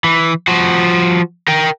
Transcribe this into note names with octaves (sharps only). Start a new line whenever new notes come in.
E3
F3 F#4
A#4 G5